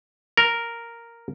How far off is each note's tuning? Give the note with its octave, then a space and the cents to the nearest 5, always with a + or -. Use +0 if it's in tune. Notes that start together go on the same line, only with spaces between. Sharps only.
A#4 -5